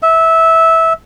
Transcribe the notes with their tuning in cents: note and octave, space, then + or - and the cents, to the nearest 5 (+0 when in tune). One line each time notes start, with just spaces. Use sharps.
E5 -15